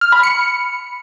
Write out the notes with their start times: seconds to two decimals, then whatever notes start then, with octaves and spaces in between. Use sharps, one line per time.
0.01 F6
0.12 B5
0.23 C#7